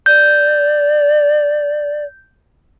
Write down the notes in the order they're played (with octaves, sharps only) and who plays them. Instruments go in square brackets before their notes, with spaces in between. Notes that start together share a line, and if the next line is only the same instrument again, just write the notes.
[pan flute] D5 [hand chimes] G6